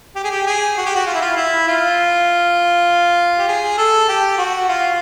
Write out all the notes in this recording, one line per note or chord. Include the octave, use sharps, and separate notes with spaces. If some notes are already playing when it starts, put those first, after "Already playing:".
G4
G#4
G4
G#4
F#4
G4
F#4
F4
E4
F4
E4
F4
G4
G#4
A4
G4
F#4
F4